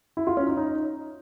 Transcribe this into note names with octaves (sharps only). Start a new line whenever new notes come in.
E4
F4
C#4
D#4
D#4